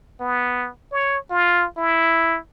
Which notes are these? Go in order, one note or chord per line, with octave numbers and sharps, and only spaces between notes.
B3
C#5
F4
E4